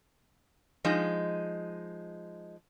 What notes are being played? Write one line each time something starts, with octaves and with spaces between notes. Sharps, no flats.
F3 G#3 D#4